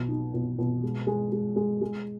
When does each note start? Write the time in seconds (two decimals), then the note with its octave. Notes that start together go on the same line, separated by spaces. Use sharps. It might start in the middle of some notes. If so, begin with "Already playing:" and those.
Already playing: B1 B2
0.09 D#4
0.34 B2
0.59 B2
0.83 G#3
1.07 G#3
1.32 G#3
1.56 G#3
1.82 G#3